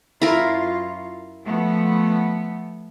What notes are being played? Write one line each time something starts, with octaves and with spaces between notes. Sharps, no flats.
F#2 E4 F4 A#4
F3 A3 B3